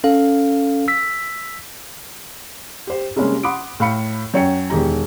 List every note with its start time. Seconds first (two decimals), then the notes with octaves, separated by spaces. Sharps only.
0.04 C#4 A4 F5
0.88 E6 B6
2.87 G4 C5
3.16 C3 G3 G#3 A#3 C#4
3.43 F#5 B5 C6 D6 D#6 D7
3.80 A2 F5 B5 C#7
4.34 F#2 C#5 G5 C#7
4.70 E1 D#3 G4 A#5